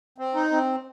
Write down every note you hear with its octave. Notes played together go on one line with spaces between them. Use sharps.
C4
D#4
C4